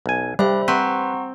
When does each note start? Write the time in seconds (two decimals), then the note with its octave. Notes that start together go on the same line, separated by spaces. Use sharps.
0.06 B1 G#5
0.39 G3 D4 C5 E5 B5
0.68 C4 B4 F#5 A#5 C#6